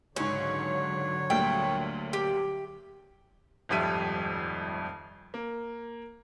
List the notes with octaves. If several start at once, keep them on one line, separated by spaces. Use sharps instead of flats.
C#2 G#2 D3 F#3 C#4 C#5
D2 A#2 G3 G5
G4
D#1 G#1 F2 G3 E5 D#7
A#3